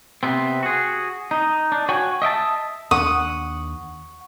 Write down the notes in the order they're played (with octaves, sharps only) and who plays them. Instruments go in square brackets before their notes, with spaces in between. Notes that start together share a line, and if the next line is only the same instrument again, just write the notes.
[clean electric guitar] C3 B3 C4
F#4 G#4
D#4
D4
F#4 C#5 G5 G#5
D#5 E5 G5 A5
[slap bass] D#2 D4 [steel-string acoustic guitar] F#5 [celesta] C#6 [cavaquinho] D#6